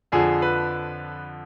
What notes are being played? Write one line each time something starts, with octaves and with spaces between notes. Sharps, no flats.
F2 D3 F3 G#4
B4